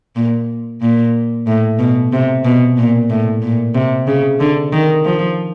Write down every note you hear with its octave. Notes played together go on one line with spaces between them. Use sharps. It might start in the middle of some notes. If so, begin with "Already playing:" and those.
A#2
A#2
A2
B2
C3
B2
A#2
A2
A#2
C3
C#3
D3
D#3
F3